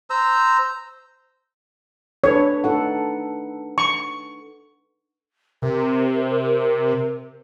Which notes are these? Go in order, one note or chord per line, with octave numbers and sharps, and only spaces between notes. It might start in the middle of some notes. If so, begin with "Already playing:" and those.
C5 A#5 E6
D4 A4 B4 C#5
D#4 A4 F#5
C#6
C3 A#4